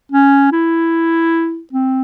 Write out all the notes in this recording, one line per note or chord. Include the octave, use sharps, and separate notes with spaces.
C#4
E4
C4